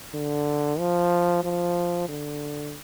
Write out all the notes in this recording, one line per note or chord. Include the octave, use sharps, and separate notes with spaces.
D3
F3
F3
D3